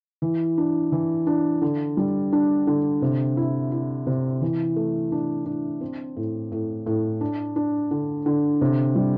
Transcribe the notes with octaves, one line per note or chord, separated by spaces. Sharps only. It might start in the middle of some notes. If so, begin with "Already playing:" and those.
E3
D4
E3
D4
D3
G3
D4
D3
C3
E4
E4
C3
E3
A3
D4
D4
C4
A2
A2
A2
D4
D4
D3
D3
C3
G3